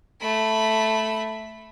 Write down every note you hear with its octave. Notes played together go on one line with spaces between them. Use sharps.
A3 B5